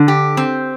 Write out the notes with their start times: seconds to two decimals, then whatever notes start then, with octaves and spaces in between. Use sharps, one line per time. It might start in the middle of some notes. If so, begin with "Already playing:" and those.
Already playing: D3
0.08 G4
0.37 C4